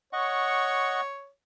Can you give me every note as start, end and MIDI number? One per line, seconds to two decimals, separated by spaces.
0.13 1.29 73
0.13 1.01 75
0.13 1.01 78
0.13 1.01 85